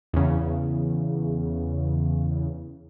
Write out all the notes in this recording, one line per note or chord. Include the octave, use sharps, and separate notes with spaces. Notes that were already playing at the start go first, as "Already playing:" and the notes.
E2 C#3